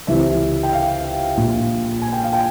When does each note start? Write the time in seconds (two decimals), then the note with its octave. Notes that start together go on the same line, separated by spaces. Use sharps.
0.07 C#2 C3 E3 E5
0.63 G5
0.73 F5
1.37 A#1 A#2
2.02 G#5
2.12 G5
2.22 F5
2.33 G5